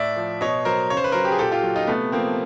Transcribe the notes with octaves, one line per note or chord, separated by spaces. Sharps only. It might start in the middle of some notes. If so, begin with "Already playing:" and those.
Already playing: A2 D5 E5
F3
B2 C#5 D#5
F#3 A#4 C5
C#3 C#5
C5
B4
F#3 A#4 C5
G4
G#4
A#2 G4 A4
F4 G4
F#3
D#4 F4
C3 A3 B3
F3 A#3 C4